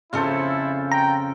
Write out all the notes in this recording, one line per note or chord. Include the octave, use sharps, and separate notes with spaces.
F2 C#3 E4 F4 A4 C5
G5 A#5